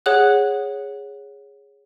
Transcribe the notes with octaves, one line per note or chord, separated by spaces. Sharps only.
G#4 C#5 F#5 F#6